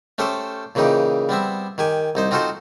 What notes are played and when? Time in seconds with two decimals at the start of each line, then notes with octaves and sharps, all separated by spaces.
0.18 A3 C#4 G4 A4 C5
0.75 A#2 C#3 E3 D#4 G4
1.29 G3 B3 C4 E5
1.78 D#3 G4 G#5
2.15 C2 D#4 C5
2.31 C4 D#4 F4 F#4 A4 C5